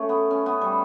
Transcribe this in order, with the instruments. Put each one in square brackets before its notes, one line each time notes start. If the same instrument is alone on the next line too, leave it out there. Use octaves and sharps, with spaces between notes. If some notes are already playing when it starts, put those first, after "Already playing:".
Already playing: [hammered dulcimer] A3 C#4
B3
C#4
B3
G3